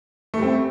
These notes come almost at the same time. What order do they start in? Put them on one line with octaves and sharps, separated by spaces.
A3 G3 C4